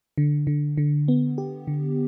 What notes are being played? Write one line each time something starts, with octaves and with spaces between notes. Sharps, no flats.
D3
D3
D3
B3
G4
D3